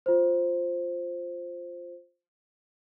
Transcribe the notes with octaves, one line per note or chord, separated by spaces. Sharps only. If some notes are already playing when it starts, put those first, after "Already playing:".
F4 C5